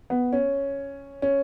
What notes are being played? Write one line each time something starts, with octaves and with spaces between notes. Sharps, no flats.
B3
C#4
C#4